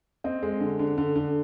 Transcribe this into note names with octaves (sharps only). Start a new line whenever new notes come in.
C4 D#5
G#3
D3
D3
D3
D3